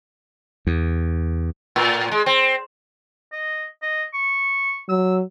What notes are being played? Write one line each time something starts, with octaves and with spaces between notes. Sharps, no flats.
E2
A2
G#3
C4
D#5
D#5
C#6
F#3 E6